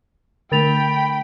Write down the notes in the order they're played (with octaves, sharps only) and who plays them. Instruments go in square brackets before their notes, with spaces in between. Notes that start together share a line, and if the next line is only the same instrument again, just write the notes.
[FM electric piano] D3 A3 [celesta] A#4 A6 F7 [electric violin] G5 [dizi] B5